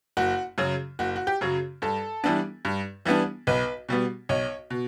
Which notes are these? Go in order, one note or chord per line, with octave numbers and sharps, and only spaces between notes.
F#1 F#4
F#2 C#3 F#3
F#1 F#4
F#4
G4
F#2 C#3 F#3
G2 A4
E3 G3 B3 D4
G2
E3 G3 B3 D4
B1 B4
B2 G3 B3
B1 C#5
B2